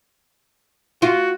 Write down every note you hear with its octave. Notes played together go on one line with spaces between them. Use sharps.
F4 F#4